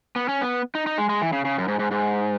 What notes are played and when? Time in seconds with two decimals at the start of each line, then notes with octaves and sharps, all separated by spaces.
0.16 B3
0.29 C#4
0.41 B3
0.75 D#4
0.86 D#4
0.98 G#3
1.09 G#3
1.22 E3
1.33 C#3
1.45 C#3
1.58 F#2
1.68 G#2
1.79 G#2
1.91 G#2